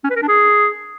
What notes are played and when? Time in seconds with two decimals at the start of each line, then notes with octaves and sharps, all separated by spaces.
0.04 C#4
0.10 B4
0.16 A#4
0.22 D4
0.28 G#4